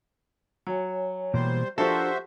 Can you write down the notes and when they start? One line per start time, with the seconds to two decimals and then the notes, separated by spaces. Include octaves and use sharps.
0.67 F#3 C#5 G#5
1.34 B2 E3 G3 A#3 C5
1.78 F3 D4 F#4 G4 A4 A#4 C5 E5